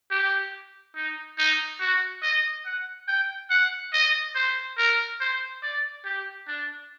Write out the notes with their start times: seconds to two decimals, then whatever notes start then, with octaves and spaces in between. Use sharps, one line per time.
0.11 G4
0.96 D#4
1.38 D#4
1.81 F#4
2.23 D#5
2.66 F#5
3.08 G5
3.50 F#5
3.93 D#5
4.35 C5
4.78 A#4
5.20 C5
5.63 D5
6.05 G4
6.48 D4